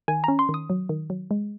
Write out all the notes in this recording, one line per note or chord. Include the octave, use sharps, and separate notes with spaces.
D#3 G#5
C#4 A#5
C6
D#3
D#6
F#3
D#3
F#3
G#3